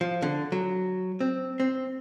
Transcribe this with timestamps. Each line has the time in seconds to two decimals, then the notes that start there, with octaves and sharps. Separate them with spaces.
0.01 F3
0.22 D3
0.52 F#3
1.20 C4
1.60 C4